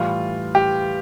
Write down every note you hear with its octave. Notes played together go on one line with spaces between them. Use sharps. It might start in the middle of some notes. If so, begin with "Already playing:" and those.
Already playing: A2 E3 G3 F4
G4